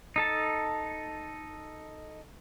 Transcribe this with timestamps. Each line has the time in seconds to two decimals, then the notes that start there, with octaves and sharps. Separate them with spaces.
0.16 D#4 A4 A5